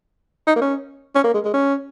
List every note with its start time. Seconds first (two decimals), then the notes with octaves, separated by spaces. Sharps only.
0.47 D#4
0.56 A#3
0.61 C#4
1.15 C#4
1.24 A#3
1.34 G#3
1.44 G#3
1.53 C#4